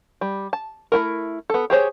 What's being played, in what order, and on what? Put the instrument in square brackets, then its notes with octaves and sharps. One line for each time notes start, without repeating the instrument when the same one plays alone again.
[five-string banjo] G3
A5
A3 E4 A#4
B3 A4
G4 G#4 C5 C#5